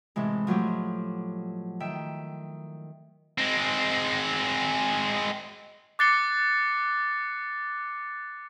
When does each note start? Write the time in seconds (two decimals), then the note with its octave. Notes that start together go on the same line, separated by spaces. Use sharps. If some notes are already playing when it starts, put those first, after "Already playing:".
0.16 A2 C3 E3 G#3
0.47 F3 F#3 A3 G4
1.80 D#3 E5 G5
3.38 G#3 C4
5.99 D6 F#6 A6 C7 C#7 G7